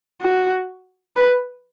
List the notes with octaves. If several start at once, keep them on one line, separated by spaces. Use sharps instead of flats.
F#4
B4